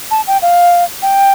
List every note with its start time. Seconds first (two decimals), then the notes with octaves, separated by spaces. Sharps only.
0.11 A5
0.27 G5
0.42 F5
1.02 G5